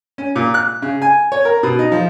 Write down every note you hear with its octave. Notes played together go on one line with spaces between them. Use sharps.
C#4
A#2
F#6
C#3
G#5
C#5
A#4
B2
D#4
F3